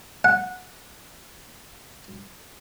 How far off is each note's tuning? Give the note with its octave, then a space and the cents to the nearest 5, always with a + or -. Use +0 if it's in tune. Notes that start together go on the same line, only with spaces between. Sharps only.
F#5 -15